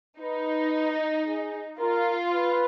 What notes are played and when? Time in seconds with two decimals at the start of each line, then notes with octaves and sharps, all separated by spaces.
0.20 D#4 B4
1.26 G#4
1.79 F4 A#4
2.33 B4